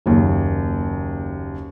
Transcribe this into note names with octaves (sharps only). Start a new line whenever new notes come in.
F#1 D#2